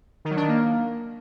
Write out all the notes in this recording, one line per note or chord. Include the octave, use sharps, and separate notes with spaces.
D#3
F#3
D4
D#3
A#3